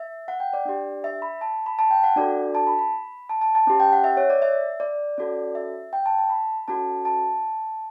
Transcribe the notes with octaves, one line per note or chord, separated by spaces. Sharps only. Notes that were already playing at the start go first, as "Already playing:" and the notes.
Already playing: E5
F#5
G5
D5
D4 G4
E5
B5
A5
B5
A5
G5
F#5
D4 F#4 A4 D5
A5
B5
B5
A5
A5
A5
C#4 G4
G5
F#5
E5
C#5
D5
E5
D5
C#4 F#4 A4
E5
G5
A5
A5
B5
C#4 F#4 A4 A5
A5